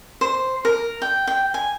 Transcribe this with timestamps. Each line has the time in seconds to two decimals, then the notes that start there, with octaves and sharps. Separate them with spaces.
0.21 C5
0.65 A#4
1.02 G5
1.27 G5
1.54 G#5